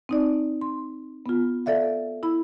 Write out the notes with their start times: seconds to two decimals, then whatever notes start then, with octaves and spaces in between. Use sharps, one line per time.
0.09 C4 D#4 D5
0.61 C6
1.26 B3 F4
1.66 A4 D5 E5 F5
2.23 E4 B5